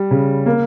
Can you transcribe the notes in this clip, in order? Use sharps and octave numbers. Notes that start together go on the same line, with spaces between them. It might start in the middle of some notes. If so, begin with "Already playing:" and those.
Already playing: G3
C#3
A#3